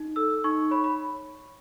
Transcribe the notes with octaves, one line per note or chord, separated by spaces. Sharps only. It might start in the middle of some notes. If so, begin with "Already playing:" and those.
Already playing: D#4
A4 E6
D#4 C#6
C#5 B5
B5